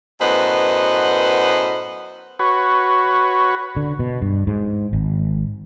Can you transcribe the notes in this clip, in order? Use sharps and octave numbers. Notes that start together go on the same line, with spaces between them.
F#2 A2 B3 B4 C5 D#5
F#4 B4 C#5
D3
B2
G2
G#2
G#1